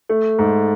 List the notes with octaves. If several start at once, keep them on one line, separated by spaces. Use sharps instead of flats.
A3
G#2